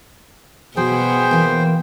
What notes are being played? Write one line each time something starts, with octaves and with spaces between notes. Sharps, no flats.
B2 F#3 B3 G#4 C5 G5
E3 A#3